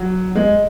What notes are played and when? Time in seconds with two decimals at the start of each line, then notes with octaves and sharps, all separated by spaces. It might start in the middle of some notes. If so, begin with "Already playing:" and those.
Already playing: F#3
0.35 G#3